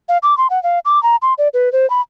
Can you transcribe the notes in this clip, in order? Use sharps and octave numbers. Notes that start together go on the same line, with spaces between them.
F5
D6
C6
F#5
F5
D6
A#5
C6
D5
B4
C5
B5